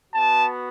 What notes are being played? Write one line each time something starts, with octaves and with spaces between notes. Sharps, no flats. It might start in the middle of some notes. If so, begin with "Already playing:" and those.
B3 F#4 A5